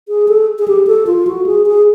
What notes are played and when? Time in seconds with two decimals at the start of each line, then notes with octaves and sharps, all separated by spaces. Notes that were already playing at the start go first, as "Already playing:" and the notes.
0.09 G#4
0.28 A4
0.59 G#4
0.68 G4
0.87 A4
1.07 F4
1.27 F#4
1.46 G#4
1.66 G#4